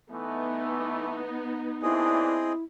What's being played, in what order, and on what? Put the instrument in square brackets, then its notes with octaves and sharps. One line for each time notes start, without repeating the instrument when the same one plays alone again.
[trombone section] E3 A3 [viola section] B3 D#4
[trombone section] D#2 E3 D4 [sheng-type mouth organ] C4 G#4 D#5 [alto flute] E4